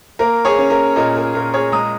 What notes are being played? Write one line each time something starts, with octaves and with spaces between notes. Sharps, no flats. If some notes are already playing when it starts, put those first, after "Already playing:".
A#3 A#4
G#4 C#5
C#4
A#4
A#2 A#4 D#5
A#4
A#2 A#4
G#4 C#5
G#3 A#5 D#6